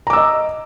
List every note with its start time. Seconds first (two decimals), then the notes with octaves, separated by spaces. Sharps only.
0.07 A#5
0.10 D6
0.13 E6
0.16 D#5